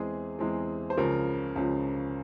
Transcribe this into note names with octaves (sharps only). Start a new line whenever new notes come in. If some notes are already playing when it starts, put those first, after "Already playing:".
Already playing: E2 E3 G#3 C4 G#4
E2 E3 G#3 C4
C5
C#2 C#3 F3 A#4
C#2 C#3 F3